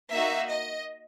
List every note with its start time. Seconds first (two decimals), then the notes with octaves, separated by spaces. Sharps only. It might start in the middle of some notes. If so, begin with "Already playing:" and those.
0.11 A#3 D#4 F#4 E5
0.50 D#5